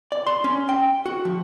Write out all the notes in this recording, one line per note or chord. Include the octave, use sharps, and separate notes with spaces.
D5
C6
C#4
G5
F#4
F3